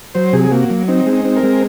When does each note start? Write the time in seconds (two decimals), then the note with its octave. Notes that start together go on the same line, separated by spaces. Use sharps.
0.15 F#3 C5
0.33 C3 G#4
0.44 G#4
0.51 A#3 F#4
0.70 F#3
0.88 C4 D#4
1.06 G#3
1.13 D#4
1.25 C4
1.36 A#4
1.43 G#3